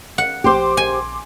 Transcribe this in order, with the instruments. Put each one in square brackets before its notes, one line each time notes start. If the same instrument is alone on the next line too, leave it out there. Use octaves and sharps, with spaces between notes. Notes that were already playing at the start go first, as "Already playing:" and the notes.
[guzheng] F#5
[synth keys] A#1 C6 D6 [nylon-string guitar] G4 C5
[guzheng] G#5